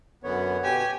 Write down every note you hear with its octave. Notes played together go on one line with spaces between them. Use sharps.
F#2 D3 B3 C#5
B2 G4 G#5